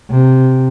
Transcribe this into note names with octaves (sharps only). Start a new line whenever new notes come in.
C3